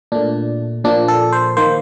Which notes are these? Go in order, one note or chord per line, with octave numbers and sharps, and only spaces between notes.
A#2 A3 D4
A#2 F3 A#3 D4
A4
C5
D#3 A#3 C5